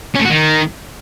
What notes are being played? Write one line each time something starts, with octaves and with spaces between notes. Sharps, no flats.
C#4
A3
F#4
D#3